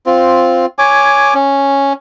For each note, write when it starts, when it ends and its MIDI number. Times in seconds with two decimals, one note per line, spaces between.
0.06 0.66 60
0.06 0.66 65
0.79 1.34 73
0.79 1.34 80
0.79 1.34 86
1.34 1.93 61